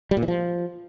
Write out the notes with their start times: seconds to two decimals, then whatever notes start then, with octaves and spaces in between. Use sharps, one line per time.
0.11 G3
0.17 A#2
0.22 E3
0.28 F3